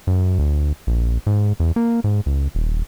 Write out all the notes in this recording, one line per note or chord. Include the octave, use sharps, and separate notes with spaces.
F#2
D2
A#1
G#2
E2
A#3
G#2
C#2
D#1